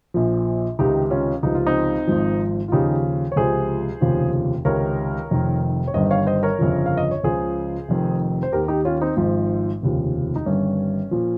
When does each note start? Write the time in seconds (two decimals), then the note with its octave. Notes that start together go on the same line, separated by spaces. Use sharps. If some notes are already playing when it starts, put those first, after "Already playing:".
0.14 A#1 A#2 F3
0.79 C#2 C3 D#3 D#4 G4
1.10 C#4 F4
1.43 C#2 C3 F3 D#4
1.55 F4
1.66 C4 D#4
2.08 G#1 G#2 F3
2.68 F4
2.72 D#2 C#3 F3 D#4 G4
3.32 C#5
3.36 C#2 C3 F3 G#4 C5
4.01 F1 D#2 C#3 F3
4.65 C#2 C3 D#3 A#4 C#5
5.31 F1 F2 D#3
5.87 C#5
5.94 G1 G2 D#3 C5 D#5
6.10 C#5 F5
6.27 C5 D#5
6.43 A#4 C#5
6.59 G1 F2 C#3 F3
6.86 F5
6.98 D#5
7.11 C#5
7.23 C#2 C#3 F3 G#4 C5
7.88 F1 F2 D#3
8.43 C5
8.52 D#2 D#3 G4 A#4
8.68 D#4 G4
8.85 C#4 F4
9.01 C4 D#4
9.17 G#1 G#2 F3
9.82 F1 D#2 C#3 F3
10.36 D#4
10.46 G1 G2 D#3 C#4
11.11 A#2 F3